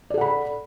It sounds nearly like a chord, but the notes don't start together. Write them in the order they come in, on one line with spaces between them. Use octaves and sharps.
D5 A4 F#5 B5